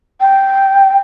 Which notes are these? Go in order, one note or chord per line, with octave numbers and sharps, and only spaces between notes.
G5